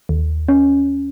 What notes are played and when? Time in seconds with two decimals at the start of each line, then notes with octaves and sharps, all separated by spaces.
0.09 D#2
0.49 C#4